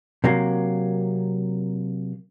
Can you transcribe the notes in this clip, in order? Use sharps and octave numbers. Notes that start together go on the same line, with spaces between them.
C3 F#3 A#3